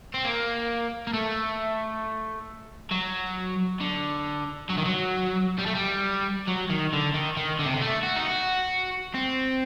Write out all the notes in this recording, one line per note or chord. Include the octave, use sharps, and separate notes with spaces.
C4
A#3
A#3
A3
F#3
D3
F#3
D#3
F#3
G3
A3
G3
F#3
D#3
D3
D#3
D#3
D3
C3
D3
A3
F#4
D#4
F#4
C4